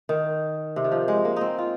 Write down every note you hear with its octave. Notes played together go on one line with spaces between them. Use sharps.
D#3
C3
D#3
F3
G#3
A#3
C4 D#4
F4